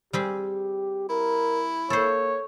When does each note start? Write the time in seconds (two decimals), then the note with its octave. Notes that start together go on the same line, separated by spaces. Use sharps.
0.13 G3 C4 G4 G#4
1.09 E4 A#4
1.90 A#3 A4 C5 C#5